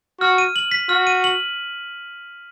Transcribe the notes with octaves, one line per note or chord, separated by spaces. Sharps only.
F#4 F6
D#7
F#7
B6
F#4 F6
D#7
F#7